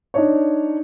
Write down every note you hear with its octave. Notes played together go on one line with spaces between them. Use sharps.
D4 D#4 C#5